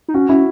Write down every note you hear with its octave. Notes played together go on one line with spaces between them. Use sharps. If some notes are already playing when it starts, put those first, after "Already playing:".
D#4
C#4 F#4
C#4 E4